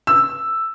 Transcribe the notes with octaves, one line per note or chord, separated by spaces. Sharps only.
E6